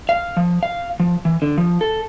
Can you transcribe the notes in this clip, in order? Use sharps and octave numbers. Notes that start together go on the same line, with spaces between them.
F5
F3
F5
F3
E3
D3
F3
A4